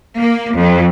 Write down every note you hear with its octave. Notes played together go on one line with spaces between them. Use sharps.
A#3
F2